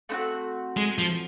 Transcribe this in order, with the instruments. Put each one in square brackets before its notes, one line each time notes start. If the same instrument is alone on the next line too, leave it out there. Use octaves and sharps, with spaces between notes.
[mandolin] A3 C4 D#4 F#4
[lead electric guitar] G#3
F3